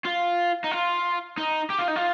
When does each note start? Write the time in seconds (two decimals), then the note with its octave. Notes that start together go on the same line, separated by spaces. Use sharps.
0.05 F4
0.64 D#4
0.71 F4
1.38 D#4
1.70 G4
1.79 F4
1.88 D#4
1.96 F4